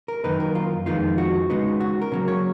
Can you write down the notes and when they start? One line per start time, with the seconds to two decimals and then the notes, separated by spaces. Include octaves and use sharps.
0.08 A#4
0.24 F#2 D#3 A#3 D#4 B4
0.40 A#4
0.55 F4
0.86 F2 D#3 G#3 B3 D#4 F4
1.18 F#4
1.50 C#3 G#3 B3 D#4
1.81 F#4
2.02 A#4
2.12 C#3 F#3 A#3
2.28 C#5